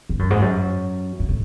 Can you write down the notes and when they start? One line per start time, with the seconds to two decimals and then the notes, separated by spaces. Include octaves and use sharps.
0.09 G#2
0.19 F#2
0.30 G#2
0.41 F#2
1.20 G#2
1.29 A2